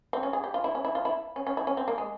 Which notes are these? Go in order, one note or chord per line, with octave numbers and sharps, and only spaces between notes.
C4
C#4
G#4
G4
F4
E4
C#4
E4
F4
E4
C#4
C#4
E4
C#4
C4
A#3
G#3